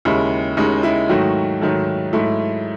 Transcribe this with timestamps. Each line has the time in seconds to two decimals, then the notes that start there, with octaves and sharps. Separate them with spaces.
0.05 D#2 C#3 G#3 E4
0.57 D#2 C#3 G#3 D#4
0.83 E4
1.09 G#2 D#3 F#3 A3 F#4
1.61 G#2 D#3 F#3 A3
2.13 G#2 F#3 A3 E4